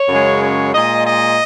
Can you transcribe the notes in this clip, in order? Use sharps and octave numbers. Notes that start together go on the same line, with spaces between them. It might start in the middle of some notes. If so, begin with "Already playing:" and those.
Already playing: C#5
F#2 C#3 G#3
C#5
A#2 G#3 D#5
D#5